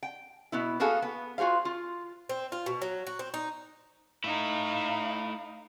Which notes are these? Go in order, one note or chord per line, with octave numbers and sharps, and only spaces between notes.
G5
B2 B3 E4
A#3 B3 F#4 G#4 A4 F5
B3
F4 F#4 G#4 C5 F5
F4
C4
F4
B2
F#3
F#4
C4
D#4
A3 D#4 E4 F5